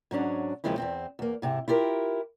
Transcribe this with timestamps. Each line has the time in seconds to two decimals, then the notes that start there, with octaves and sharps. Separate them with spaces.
0.11 G#2 F#3 C#4 D4
0.64 D#2 C#3 F3 G#3 C4 E4
0.78 E2 G2 C4
1.19 E2 A#3
1.42 G#2 C3 E4
1.68 E4 F4 G4 A#4